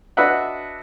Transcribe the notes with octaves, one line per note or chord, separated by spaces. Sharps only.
D4 F#4 B4 D#5 E5 F#5